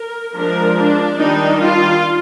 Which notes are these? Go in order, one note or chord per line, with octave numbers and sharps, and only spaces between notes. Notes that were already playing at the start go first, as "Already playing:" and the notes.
Already playing: A#4
F3 G#3 D4 A#4
D4
D#3 G3 D4 D#4
F4